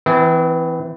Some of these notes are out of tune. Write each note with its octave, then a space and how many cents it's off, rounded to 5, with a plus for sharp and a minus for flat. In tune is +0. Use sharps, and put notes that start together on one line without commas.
E3 -5 C4 -40